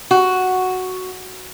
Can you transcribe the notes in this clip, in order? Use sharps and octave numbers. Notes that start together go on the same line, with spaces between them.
F#4